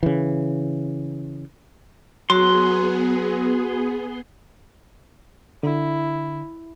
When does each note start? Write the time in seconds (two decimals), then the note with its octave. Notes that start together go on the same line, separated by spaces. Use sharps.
0.03 C#3 E3
2.30 F#3 B3 F#4 G#4 C6
5.63 D3 E4